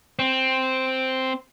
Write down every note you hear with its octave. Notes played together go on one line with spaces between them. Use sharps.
C4